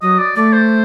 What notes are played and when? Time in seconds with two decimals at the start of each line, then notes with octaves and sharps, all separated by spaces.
0.02 F#3 D#5
0.19 D5
0.36 A3 D5
0.53 C5